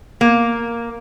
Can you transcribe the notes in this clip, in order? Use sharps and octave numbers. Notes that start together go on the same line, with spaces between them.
A#3